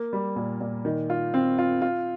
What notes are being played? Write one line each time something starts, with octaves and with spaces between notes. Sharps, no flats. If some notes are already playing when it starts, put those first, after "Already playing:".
Already playing: A#3
G3
A#2
A#2
D#3
F4
C4
F4
F4